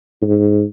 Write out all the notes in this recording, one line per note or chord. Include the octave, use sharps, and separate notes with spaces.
G#2